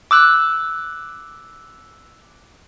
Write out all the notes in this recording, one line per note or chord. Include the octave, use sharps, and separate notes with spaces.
D6 E6 F#6